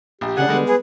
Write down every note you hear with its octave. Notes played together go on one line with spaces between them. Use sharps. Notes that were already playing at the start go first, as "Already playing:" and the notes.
A#1 G4
C#3 D4 G#4 F#5
D3 G3 G#3 B3
G#4 B4